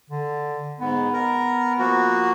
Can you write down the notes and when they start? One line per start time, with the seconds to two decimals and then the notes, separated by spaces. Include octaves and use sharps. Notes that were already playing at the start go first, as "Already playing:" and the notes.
0.10 D3
0.80 G#2 B3
1.13 A#4
1.79 F3 A#3 F#4